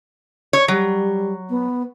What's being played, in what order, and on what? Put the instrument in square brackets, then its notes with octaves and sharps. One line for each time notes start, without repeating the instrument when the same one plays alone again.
[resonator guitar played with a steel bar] C#5
[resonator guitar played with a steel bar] F#3 [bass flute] G3
[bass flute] B3